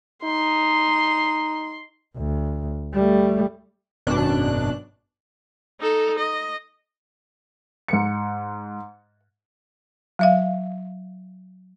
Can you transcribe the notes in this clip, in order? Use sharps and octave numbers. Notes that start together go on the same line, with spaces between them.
D#4 C6
D2
G3 A3
G#1 F#2 B2 D4 F#6
D#4 A4
D#5
G#2 C#7
F#3 E5 F5